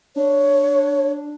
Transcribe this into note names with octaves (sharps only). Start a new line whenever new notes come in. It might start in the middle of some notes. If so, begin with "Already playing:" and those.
D4 C#5